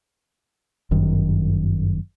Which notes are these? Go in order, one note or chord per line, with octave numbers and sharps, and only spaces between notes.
G1 F#2 D#3